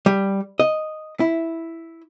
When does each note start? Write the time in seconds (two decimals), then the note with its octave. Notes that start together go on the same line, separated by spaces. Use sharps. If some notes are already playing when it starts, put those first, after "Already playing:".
0.06 G3
0.60 D#5
1.20 E4